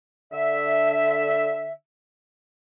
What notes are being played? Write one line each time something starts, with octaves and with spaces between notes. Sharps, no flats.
D3 E5